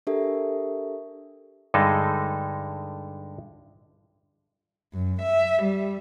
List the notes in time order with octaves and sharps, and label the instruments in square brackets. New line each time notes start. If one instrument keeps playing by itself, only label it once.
[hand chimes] D4 G4 A4 A#4 E5
[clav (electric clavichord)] G2 D3 G#3 D#4 A4
[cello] F#2
E5
G3